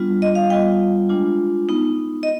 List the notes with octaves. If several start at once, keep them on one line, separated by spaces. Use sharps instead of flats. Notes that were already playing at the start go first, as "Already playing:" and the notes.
Already playing: G3 B3 D4 F4
D#5
F5
G3 B3 F4 G5
G#3 D4 F4
B3 D#4
D#5